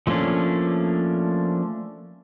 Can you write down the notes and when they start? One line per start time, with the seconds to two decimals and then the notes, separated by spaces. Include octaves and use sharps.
0.07 F3 A3 A#3 C#4 D4